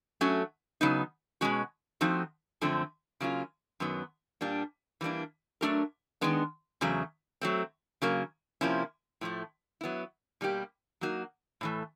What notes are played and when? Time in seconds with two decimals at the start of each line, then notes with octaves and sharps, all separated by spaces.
0.21 F#3 A3 C#4
0.81 C#3 F#3 B3 D#4
1.41 B2 G#3 C#4 F#4
2.01 F3 A3 C4 D#4 F#4
2.61 F#2 D3 F3 A3 C4
3.20 C#3 F#3 A#3 C#4 F4
3.80 F#2 D#3 F#3 B3
4.41 A#2 G3 A#3 D4
5.01 E3 G3 A#3 D4
5.61 F#3 A3 D4 G4 A#4
6.21 D#3 G#3 B3 D4
6.81 E2 C#3 F#3 A3
7.41 F#3 A3 C4
8.02 C#3 F#3 A#3
8.61 C3 F3 A#3 C#4 E4
9.21 A2 F3 A3
9.81 F#3 B3 E4
10.41 B2 G3 A#3 D#4 G4
11.01 F#3 A#3 D#4 F#4
11.61 A2 E3 A3